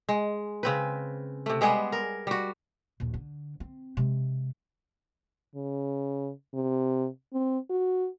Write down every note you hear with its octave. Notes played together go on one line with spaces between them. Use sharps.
G#3
C#3 C4 B4
C3 A3
G3 G#3 B3 G#4
A#4
G3 F#4
A#1 D#2
D3
C4
C3 G#3
C#3
C3
C4
F#4